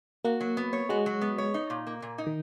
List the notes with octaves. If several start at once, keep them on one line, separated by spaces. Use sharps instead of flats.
A#3 F#4
F#3
B3
C#5
G#3 F#4
F#3
B3
C#5
D#4
A#2
A#3
A#2
D#4
D#3